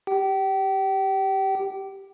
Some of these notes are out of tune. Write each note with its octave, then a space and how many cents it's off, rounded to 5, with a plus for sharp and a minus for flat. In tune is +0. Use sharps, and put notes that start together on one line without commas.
G4 +0 G5 -35